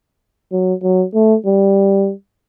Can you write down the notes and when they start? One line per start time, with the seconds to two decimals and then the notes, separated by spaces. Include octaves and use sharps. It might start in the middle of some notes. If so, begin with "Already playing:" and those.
0.52 F#3
0.83 F#3
1.14 A3
1.46 G3